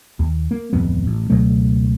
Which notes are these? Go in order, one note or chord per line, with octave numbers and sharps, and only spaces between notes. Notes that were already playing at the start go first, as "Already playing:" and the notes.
D#2
A#3
D1 G#1 F2 B3
A1
C#2 B2 F#3 A3